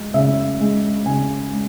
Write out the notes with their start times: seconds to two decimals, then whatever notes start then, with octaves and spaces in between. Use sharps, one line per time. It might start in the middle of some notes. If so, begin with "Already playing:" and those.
Already playing: G#3
0.14 C#3 E5
0.60 G#3
1.05 C#3 G#5
1.52 G#3